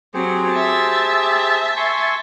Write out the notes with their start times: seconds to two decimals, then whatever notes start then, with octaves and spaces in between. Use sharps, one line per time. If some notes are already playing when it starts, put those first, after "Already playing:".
0.14 F#3 C4 G4 G#4 C5
0.52 E5 A5
1.77 G#5 C6 C#6